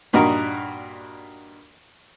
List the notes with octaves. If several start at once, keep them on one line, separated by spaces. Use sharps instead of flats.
G2 A#2 D#4 F#4 A#4